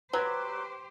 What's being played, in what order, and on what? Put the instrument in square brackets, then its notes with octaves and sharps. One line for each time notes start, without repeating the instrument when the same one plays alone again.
[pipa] F#3 [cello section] G4 C5 [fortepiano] B4